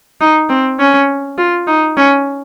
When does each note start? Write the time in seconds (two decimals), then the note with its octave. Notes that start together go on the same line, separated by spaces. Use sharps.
0.21 D#4
0.50 C4
0.79 C#4
1.38 F4
1.68 D#4
1.97 C#4